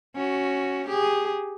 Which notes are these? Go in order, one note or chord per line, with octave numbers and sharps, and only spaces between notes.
C#4 F#4
G4 G#4